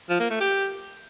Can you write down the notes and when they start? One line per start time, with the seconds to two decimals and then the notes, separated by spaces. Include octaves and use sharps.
0.10 F3
0.20 A#3
0.30 A3
0.41 G4